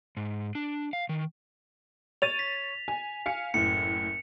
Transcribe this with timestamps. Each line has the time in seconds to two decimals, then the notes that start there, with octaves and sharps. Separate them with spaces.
0.17 G#2
0.55 D4
0.93 F5
1.09 D#3
2.22 C#5 A6 D#7 F7
2.39 B6
2.88 G#5
3.26 F5 G#5 C#7
3.54 F#1 A2 C#7